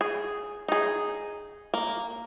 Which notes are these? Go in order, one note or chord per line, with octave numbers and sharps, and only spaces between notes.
G#4
D#4 G#4
A#3